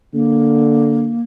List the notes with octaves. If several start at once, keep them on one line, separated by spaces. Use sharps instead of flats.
D3 A#3